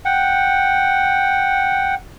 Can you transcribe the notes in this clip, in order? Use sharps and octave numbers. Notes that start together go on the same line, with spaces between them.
F#5 G5